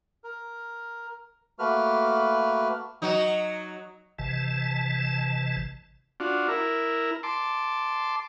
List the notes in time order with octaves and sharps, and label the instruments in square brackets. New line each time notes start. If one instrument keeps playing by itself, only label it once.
[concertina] A#4
A3 A#3 F#4 B4 F6
[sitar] F#3 D#4
[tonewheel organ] G#1 C3 E3 A5
[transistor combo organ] D4 F4 F#4
E4 A#4
A5 C6 D6